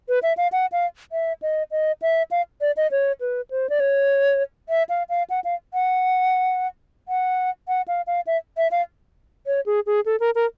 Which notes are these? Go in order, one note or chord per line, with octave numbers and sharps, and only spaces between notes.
B4
E5
F5
F#5
F5
E5
D#5
D#5
E5
F5
D5
D#5
C#5
B4
C5
D5
C#5
E5
F5
F5
F#5
F5
F#5
F#5
F#5
F5
F5
E5
E5
F5
C#5
G#4
G#4
A4
A#4
A#4